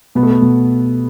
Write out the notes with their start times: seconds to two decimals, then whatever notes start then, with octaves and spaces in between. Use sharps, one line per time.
0.15 B2 B3
0.23 A3
0.30 B3
0.42 B2